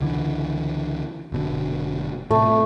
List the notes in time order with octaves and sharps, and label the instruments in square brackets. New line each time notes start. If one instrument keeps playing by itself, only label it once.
[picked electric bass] C#2 D3 E3
F1 B2 D3
[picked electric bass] A2 C3 [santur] A3